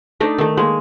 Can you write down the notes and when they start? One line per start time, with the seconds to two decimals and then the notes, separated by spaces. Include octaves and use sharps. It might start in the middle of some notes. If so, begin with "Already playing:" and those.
0.20 A3 D4 D#4 D5
0.38 D#3 A3
0.57 G#3 A#3